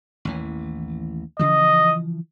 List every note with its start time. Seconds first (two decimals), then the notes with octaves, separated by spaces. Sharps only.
0.25 A1 D#2 E3
1.39 C#3 E3 F3 D#5